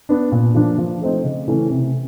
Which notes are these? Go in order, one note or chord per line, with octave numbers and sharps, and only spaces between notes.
B3 D4
A#2
F3 A#3 D4
F3
A3 C4 D#4
C#3
E3 A3 C#4
C3